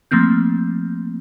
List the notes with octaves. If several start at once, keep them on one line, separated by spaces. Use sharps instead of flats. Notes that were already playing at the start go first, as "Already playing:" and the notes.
F3 A3 A#3 C4 G6